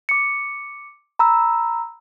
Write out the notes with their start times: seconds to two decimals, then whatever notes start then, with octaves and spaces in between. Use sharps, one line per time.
0.09 D6 C#7
1.19 A#5 B5 E6